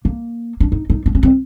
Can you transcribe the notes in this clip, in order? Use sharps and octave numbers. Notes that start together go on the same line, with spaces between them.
A#3
D4
D#4
D#4
D4
C#4
C4